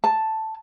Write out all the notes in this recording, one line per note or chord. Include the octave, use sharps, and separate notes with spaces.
A5